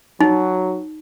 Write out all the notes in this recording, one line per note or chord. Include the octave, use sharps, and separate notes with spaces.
F#3 D#4